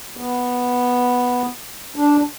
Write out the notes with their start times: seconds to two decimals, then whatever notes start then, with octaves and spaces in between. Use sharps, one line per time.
0.17 B3
1.96 D4